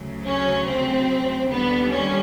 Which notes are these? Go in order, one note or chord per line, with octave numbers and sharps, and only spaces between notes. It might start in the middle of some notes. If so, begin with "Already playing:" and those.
Already playing: D2 C#3 F#3
C#4
C4
D#2 D3 G3 B3
C#4